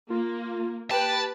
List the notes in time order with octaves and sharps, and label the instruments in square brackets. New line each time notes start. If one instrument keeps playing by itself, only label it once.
[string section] A#3 [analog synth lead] F4
[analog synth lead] G4 [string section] B4 [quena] G5 [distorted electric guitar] A5